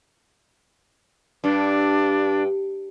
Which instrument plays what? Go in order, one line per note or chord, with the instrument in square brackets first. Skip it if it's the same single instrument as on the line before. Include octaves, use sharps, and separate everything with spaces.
[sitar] G2 [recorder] D4